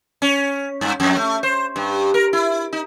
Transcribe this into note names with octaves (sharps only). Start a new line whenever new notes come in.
C#4
G2
F2
A3
C5
G2
A#4
E4
D#4